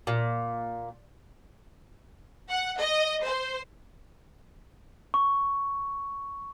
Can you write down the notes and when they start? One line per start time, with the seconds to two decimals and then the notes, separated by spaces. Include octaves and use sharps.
0.07 A#2
2.49 F#5
2.79 D#5
3.25 C5
5.14 C#6